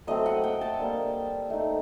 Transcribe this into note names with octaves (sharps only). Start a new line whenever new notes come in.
F#3 A3 C4 D#5
F#5
G5
A5
G3 A#3 D4
A3 D#4